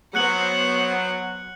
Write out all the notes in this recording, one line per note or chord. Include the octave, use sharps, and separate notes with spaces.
F#3 B3 C5 F#5 F#6 C#7 F#7